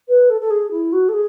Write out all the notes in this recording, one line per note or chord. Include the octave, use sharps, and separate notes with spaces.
B4
A4
A4
G#4
E4
F#4
A4
G#4